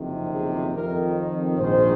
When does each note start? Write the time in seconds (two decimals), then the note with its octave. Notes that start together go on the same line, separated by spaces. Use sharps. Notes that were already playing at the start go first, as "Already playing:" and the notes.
Already playing: F#1 F2 C3 D#3
0.34 G#4
0.75 F2 D#3 A#4
1.58 A#1 G#2 D#3 C5